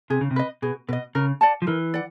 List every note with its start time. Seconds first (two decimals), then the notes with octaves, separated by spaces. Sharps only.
0.10 C3 G#4
0.21 C#3
0.31 C3
0.36 B4 D#5
0.62 B2 G#4
0.88 B2 B4
0.93 D#5
1.15 C#3 A#4
1.41 D5 F#5 A5
1.62 F3
1.67 E3 A#4
1.94 D5 F#5